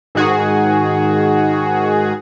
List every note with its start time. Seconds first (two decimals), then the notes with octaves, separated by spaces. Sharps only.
0.15 G#2 D#3 F#4 G#4